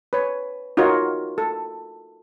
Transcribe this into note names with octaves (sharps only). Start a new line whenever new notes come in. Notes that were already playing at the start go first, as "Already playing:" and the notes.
B4 C#5
D#4 F4 F#4 A#4 C#5
A4